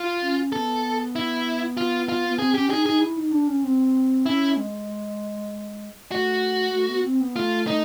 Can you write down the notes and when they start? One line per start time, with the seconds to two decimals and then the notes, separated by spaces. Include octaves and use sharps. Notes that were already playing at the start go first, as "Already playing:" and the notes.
Already playing: F4
0.22 C#4
0.52 B3 A4
1.16 E4
1.77 F4
2.09 F4
2.29 B3
2.39 C4 G#4
2.54 C#4 G4
2.70 D#4 G#4
2.85 D#4 G#4
3.01 E4
3.17 D#4
3.32 D4
3.48 C#4
3.64 C4
4.26 C#4 E4
4.57 G#3
6.11 A3 F#4
6.73 A3
6.89 B3
7.04 C4
7.21 B3
7.36 A3 F4
7.67 D#4